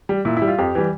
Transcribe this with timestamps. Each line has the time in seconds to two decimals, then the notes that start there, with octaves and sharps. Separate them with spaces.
0.09 G3
0.25 A#2 E4
0.37 E4
0.42 G3
0.48 F4
0.58 F2 G4
0.75 E3 G3